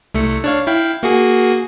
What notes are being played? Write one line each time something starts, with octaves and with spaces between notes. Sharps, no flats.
C2 A3 C#7
D4 C#5 F5
E4 F5 G5
A#3 F#4 G#4